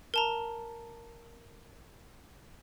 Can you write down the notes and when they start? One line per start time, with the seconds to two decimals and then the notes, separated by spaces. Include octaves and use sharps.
0.14 A#4 A5 A#5